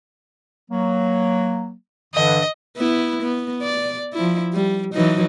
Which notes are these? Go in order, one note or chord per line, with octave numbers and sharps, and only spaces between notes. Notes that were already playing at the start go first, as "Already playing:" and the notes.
F#3 A#3
G2 D3 E3 D#5
B3 E4
B3
D5
F3 E4
G3
E3 F#3 D#4